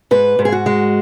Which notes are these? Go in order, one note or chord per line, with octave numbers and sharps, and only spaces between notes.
G#2 B4
G#2
G#4
F#4
G#3